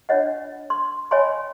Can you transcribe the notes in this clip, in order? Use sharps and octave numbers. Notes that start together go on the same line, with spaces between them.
D4 F4 C#5 D#5 F#5
C6
C#5 D#5 G5 G#5 B5 C6